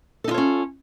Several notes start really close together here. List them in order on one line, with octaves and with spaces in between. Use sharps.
A4 D#4 F4 C#5 C#4